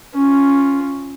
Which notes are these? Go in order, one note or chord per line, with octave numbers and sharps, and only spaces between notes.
C#4 F4